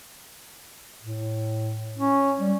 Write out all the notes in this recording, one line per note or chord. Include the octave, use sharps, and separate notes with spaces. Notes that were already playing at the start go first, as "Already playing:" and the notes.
A2
C#4
G3